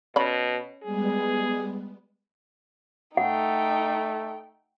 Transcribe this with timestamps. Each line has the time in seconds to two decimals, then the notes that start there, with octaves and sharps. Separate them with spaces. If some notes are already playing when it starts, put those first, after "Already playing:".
0.16 B2 C#4 B5
0.83 G3 G#3 B3 G#4
3.17 A3 D#4 F#5 G5